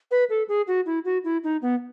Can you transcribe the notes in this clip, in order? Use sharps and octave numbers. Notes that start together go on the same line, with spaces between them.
B4
A4
G#4
F#4
E4
F#4
E4
D#4
B3